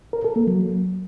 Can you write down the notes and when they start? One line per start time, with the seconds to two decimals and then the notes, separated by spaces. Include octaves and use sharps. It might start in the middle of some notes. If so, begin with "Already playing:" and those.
0.13 A#4
0.24 A4
0.36 A#3
0.47 F#3